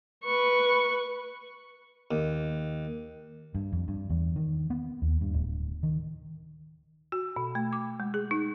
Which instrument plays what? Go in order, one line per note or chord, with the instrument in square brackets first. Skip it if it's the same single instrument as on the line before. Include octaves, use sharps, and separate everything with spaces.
[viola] B4 C#6
[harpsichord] D#2
[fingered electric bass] G2
F2
G2
E2
D#3
B3
D#2
G2
D1
D#3
[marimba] F#4
B2
A3
D6
G#3
G#4
D#4